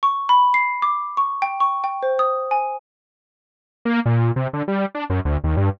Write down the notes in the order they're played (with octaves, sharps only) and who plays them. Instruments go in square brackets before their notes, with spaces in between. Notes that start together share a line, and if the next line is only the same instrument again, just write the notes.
[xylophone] C#6
B5
C7
D6
C#6
G5
C#6
G5
C5
D#6
G#5
[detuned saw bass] A#3
A#2
C3
D3
G3
D4
F#2
D2
D#2
G2